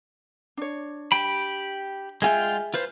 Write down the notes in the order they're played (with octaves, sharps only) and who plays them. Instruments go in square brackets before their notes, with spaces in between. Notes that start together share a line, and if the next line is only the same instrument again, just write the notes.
[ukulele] D4 C#5
[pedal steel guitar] G4 G5 B5
[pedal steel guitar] G#3 F4 G5 [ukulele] G#4 E5 G#5
[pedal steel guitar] F4 B4 C5